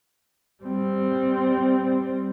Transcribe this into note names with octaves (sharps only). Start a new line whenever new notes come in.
G3 C4